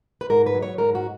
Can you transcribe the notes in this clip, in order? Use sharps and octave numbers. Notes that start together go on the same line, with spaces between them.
B4
G#2 A#4
B4
F#3
C#5
G#2 A#4
F#4